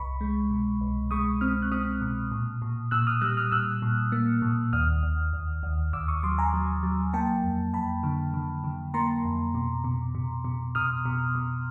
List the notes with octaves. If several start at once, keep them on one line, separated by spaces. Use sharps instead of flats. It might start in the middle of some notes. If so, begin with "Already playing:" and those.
Already playing: C2 B5 C#6
G#3
B2
C2
G#3 C#6 D#6
C4 D#6 F6
F#6
C4 D#6 F6
B2
A#2
A#2
A#2 E6 F#6
D#6 F6
G3 E6 F#6
D#6 F6
A#2 E6 F#6
A#2
A#3
A#2
D#2 D#6 F6
D#2
D#2
D#2
D#2 D6 E6
C#6 D#6
F#3 C6 D6
G#5 A#5
F#3
F#3
A#3 G5 A5
F2
F2 A5 B5
D3
D3
D3
A#3 A#5 C6
F2
B2
B2
B2
B2
B2 D#6 F6
B2
B2